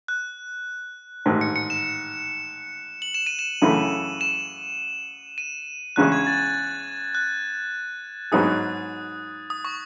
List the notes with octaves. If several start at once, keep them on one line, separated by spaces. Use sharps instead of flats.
F#6
A1 G#2 D#3
C#7
C#7
E7
F#7
E7
D#7
E7
F#2 C#3 E3 A3
E7
D#7
E2 C#3 G#3 C#4 G#4 F#6
G#6
A6
F#6
G#2 F#3 B3 D#4 G#4 D#6
D#6
C#6